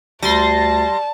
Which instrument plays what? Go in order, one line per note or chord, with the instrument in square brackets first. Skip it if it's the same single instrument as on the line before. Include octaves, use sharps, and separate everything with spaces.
[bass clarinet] D2 [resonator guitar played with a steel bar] G3 [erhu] A5 [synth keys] C6 A6 A#6